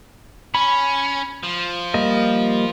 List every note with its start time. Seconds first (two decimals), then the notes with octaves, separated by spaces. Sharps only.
0.55 C#4 B5
1.44 F3
1.94 G3 A#3 D#5